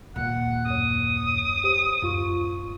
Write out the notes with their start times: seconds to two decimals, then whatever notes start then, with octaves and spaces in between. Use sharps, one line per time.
0.16 D#2 A#2 F#5
0.66 F#2 C#5 D#6
1.64 G4 C5
2.02 D1 F#2 F4 C#6